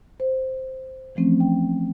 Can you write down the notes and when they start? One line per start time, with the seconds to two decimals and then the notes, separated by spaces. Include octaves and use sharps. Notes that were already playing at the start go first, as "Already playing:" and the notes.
0.20 C5
1.15 E3 F3 A3 C4 C#4
1.40 G5